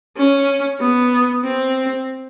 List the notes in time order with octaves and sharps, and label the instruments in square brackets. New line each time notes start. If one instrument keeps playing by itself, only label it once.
[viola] C#4
B3
C4